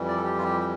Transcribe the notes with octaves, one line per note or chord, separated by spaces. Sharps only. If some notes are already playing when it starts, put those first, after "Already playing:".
Already playing: F2 E3 G3
D5
A4
G4
F4
G4
G4